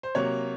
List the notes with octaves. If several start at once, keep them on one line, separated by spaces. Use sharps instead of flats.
C5
C3 F#3 A#3 C#5